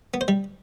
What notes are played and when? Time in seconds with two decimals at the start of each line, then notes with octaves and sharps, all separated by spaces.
0.14 B3
0.21 C5
0.28 G3